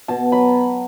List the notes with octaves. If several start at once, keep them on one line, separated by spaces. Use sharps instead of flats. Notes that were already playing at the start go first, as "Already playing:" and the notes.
B2 A5
F#3 B5